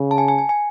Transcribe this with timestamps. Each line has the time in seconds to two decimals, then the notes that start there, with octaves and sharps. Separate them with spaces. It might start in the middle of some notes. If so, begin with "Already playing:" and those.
Already playing: C#3
0.11 A5
0.18 G#5
0.28 G#5
0.38 G#5
0.49 G#5